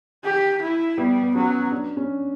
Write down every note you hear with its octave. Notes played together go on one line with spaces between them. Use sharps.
G4
E4
G3 B3
B3
F#3 C#4
D4
C#4